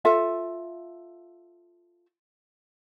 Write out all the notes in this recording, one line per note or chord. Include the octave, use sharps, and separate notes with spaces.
F4 A4 E5